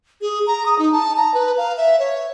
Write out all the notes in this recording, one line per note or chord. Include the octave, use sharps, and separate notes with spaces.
G#4
A#5
D#6
D#4
A5
A#5
B4
F5
E5
C#5